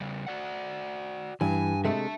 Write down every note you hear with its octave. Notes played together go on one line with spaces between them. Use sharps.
C#3 G3
F#4 D5 F#5
G2 E3 G#5
C3 G#3 A3 E5 A5